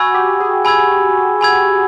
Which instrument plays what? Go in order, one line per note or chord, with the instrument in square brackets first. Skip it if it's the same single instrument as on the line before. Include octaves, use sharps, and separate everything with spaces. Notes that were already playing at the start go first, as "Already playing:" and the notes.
Already playing: [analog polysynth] F#4 [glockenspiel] G#5 B5 E6 G#6
[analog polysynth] G4
G#4
[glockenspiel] G#5 B5 E6 G#6
G#5 B5 E6 G#6